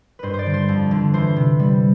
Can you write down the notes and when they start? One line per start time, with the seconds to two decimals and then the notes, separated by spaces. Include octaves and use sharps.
0.19 G2 B4 C5
0.34 C5
0.39 D5
0.46 D3
0.54 C5
0.68 F2
0.91 D3
1.14 E3 C5
1.37 C3
1.59 G3